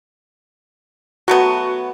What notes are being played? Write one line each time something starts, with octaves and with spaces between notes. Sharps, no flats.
F#3 A3 B3 F#4